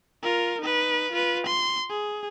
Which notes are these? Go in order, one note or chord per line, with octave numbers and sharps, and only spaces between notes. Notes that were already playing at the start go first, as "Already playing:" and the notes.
F4 A#4
D#4 B4
F4 B4
C6
G#4